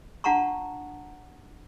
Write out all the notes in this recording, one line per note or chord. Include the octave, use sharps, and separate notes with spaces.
D4 F4 F#5 A5 A#5 C#6